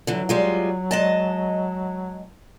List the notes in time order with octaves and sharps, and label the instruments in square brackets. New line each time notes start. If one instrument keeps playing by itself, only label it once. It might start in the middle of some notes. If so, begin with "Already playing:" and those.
[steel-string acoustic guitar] D3 E3 [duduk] F#3
[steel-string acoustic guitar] G3 G#3 F4
G#3 D#5 A5